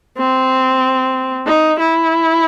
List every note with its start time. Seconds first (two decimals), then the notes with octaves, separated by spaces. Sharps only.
0.18 C4
1.46 D#4
1.79 E4